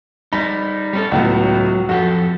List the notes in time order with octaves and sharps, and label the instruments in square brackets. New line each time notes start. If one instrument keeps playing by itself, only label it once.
[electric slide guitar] G3 D#4 [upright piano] B5
[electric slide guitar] G3 C#4 A4
[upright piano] C#2 A2 B3 [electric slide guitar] F#3
[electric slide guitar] F2 G4 A4 [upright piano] F#4